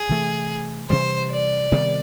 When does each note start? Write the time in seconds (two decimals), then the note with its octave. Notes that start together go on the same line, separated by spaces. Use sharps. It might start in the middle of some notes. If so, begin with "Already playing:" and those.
Already playing: G#4
0.09 C3 E3 A3
0.90 C3 E3 G3 C5
1.30 D5
1.72 C3 D#3 G3 B3